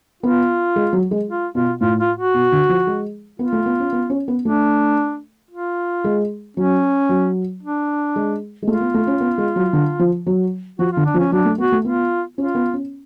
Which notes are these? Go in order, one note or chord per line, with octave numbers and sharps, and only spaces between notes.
B3 F4
G#3
F#3
G#3
F4
B2 F4
A2 F4
F4
F#4
B2
D3
F3
G#3
B3 F4
A3
B3
C#4
B3
C#4
B3
A3 D4
F4
G#3
F#3 C#4
F#3
D4
G#3
G#3
A3 F4
B3
A3
C#4
B3
G#3
F#3
D3
F3
F#3
F3 F#4
F4
D3
D4
F3
C#4
F#3 D4
A3
B3 F#4
A3
B3 F4
C#4 F4
B3
C#4